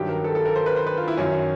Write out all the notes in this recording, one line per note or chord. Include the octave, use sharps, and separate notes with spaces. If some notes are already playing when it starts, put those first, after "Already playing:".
Already playing: G2 D#3 F#3 G4
A#4
A4
A4
A#4
C5
B4
C5
B4
F4
E4
F#2 D#3 F#3 C#4